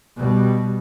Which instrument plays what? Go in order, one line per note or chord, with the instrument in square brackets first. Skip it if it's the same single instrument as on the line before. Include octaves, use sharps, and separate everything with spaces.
[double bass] B2 G3